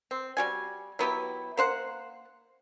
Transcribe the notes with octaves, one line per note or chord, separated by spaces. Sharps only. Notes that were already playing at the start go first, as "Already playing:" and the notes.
C4
G3 F#4 G#5
F#3 B3 E4 G4
A#3 C5 F#5